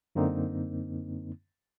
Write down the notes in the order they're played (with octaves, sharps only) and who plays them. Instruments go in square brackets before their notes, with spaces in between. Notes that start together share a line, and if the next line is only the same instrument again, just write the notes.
[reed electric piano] F#2 D3 A#3 C4 D#4